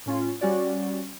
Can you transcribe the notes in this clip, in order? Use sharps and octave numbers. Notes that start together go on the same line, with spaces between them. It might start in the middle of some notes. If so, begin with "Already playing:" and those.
A2 C#4 F4
G3 C#4 F#4 D5